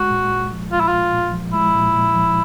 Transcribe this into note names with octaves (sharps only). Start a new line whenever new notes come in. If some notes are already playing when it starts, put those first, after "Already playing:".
Already playing: G#3 F#4
A#2
A#2
F3
G#3 F4
E4
A#2 F4
A#2
F3
G#3 E4
A#2
A#2
F3